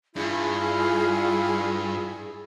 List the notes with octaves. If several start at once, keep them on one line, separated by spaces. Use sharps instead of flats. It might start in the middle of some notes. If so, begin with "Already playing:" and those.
G2 E4 F4 G#4